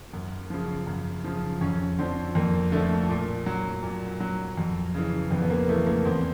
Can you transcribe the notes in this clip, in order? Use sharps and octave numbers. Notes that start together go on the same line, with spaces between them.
F#2
C#3 F3
F#2
C#3 F3
F2 C#4
D3 F3 C4
F2 A#3
D3 F3 A3
A#2
F#3
A#2
F#3
F2
C#3 E3
F2 B3
B3
A#3
C#3 E3 A3
A#3
E2 C4